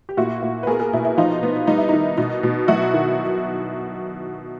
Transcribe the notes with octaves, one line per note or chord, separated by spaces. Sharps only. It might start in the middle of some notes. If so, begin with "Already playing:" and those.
G4
A#2 E4 F#4
A#2
B4
B3 G#4 A#4
G#4 A#4
B2 E4
E4
F3 D#4 F4
B3
G3 D#4
E4
D#3 D#4
B2 D#4
B2
F#3 E4 F#4
D#3